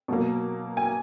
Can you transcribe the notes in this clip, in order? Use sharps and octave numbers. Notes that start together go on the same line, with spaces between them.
B2 F#3 A#3
G#5